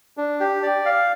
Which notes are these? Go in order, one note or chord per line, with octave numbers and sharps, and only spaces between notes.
D4
G4
D5
F5